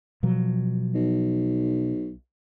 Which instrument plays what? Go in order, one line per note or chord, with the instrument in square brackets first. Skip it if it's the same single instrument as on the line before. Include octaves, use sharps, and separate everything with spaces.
[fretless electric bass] B2 F3 F#3
[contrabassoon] B1